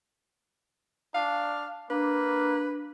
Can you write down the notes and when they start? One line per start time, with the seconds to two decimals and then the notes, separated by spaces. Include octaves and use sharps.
1.15 D4 F5
1.90 A#3 D4 B4